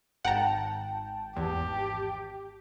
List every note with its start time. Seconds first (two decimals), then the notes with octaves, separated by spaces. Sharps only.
0.25 G#1 F#5 G5 A5 A#5
1.37 E2 G4